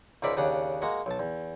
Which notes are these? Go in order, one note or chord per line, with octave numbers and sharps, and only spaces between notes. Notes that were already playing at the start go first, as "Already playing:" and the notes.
C#2 G#2 A#4 D5 E5 B5
D#2 C#3 D4 F#5
G#3 A#3 F#4
B1 A5
E2